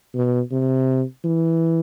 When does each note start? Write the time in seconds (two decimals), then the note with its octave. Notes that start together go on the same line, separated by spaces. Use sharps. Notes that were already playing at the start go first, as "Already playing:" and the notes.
0.15 B2
0.52 C3
1.24 E3